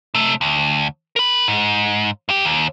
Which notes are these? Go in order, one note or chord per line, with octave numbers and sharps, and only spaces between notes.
C3 A3
D2
A#4 B5
G#2
G2 G4
D#2